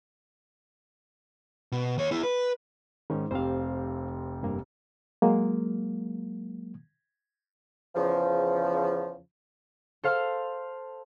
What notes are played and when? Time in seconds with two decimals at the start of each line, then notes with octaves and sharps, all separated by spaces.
1.72 B2
1.98 D#2 C#5
2.11 B3 E4
2.23 B4
3.10 G#2 D#3 C#4 D#4
3.31 F1 C4 G4 C5 F5
4.43 G2 A#3
5.22 F#3 G#3 A#3
7.95 E2 C#3 F3
10.04 A4 C5 F5 A5 C6 F6